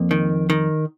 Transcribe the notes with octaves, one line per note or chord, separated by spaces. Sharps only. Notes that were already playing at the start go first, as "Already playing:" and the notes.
Already playing: F2 A#3
D#3
D#3